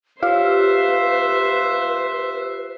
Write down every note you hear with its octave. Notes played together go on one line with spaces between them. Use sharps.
F4 G4 B4 C5 E5 F5